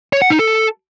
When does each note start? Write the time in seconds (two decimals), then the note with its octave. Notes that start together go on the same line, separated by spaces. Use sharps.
0.13 C#5
0.22 F#5
0.30 D#4
0.39 A4